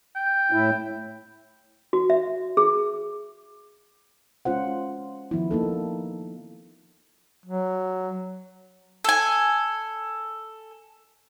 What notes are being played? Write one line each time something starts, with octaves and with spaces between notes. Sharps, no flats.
G5
A2 E4
F#4
E5
G#4
G#3 C#4 F4 C5 F#5
D#3 F3 B3 E4
A#3 D#4 A4
F#3
A4 G#5